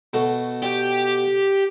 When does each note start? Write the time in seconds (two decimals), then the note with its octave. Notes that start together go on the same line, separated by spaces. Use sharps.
0.13 B2 A3 F#4
0.63 G4